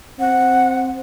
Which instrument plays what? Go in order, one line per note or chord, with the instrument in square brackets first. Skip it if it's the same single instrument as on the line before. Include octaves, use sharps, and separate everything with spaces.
[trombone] C4 [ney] F#5